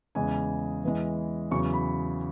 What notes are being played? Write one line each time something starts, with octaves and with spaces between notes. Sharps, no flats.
E2 C#3 G#3 G#5
E2 E3 G#3
E2 C#3 F#3 C#6
B5